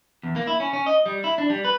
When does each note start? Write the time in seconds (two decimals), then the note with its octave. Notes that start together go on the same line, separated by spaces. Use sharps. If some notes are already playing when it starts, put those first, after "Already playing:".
0.23 E2
0.36 A#3
0.47 E4
0.60 C#4
0.73 C#4
0.86 D#5
1.06 G3
1.24 E4
1.38 D4
1.50 G3
1.65 B4